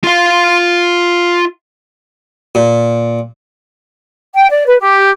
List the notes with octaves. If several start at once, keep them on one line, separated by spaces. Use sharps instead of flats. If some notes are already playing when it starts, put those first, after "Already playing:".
F4 F5
A#2
G5
D5
B4
G4